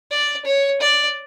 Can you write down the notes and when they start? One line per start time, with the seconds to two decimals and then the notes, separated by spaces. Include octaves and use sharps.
0.11 D5
0.45 C#5
0.81 D5